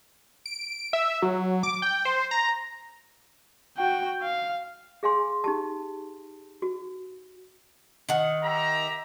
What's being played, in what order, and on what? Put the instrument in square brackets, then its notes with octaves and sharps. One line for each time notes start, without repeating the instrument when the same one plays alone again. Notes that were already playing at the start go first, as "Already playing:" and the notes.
[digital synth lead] D7
E5
F#3
D6
G5
C5
A#5
[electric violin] F#4 G5
F5
[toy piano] G#4 F5 G#5 C6
D#4 G4 A5
F#4
[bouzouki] D#3 F#5
[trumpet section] G4 E5 A#5